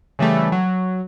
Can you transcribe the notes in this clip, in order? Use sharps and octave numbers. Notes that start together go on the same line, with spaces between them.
C#3 E3 G3 A3
F#3